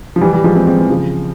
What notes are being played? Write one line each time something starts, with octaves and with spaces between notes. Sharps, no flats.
F3
E3 G3
E3 G3
F3 G#3
G#3 C4
G#3 C4
E3
C#3 F3